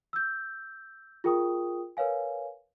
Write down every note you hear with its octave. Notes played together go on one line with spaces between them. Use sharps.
E6 G6
F4 G#4 A#4 G5 C#6 D#6
A#4 B4 C#5 F5 G#5